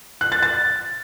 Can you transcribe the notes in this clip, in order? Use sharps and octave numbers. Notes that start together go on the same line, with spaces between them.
F#6
A6
A6